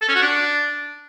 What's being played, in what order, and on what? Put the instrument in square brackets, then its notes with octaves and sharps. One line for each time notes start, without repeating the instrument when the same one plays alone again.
[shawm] A4
C#4
F#4
D4